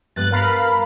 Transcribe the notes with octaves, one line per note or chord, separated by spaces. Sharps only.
G2 B3 F#6 A6
A#4 F5 B5